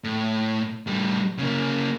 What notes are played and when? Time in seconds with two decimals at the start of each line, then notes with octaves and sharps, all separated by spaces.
0.04 A2
0.87 A2 G3
1.39 C#3 A#3